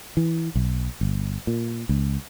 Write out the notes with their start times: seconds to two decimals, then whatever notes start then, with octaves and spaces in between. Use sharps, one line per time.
0.17 E3
0.56 B1
1.01 G1
1.47 A#2
1.89 C#2